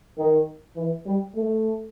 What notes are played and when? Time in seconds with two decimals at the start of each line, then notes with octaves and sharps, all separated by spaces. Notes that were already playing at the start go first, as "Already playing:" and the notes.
0.18 D#3
0.77 E3
1.06 G3
1.36 A3